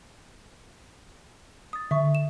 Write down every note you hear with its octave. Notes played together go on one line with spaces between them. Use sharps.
D#6 A6
D3 E5 C#6
E7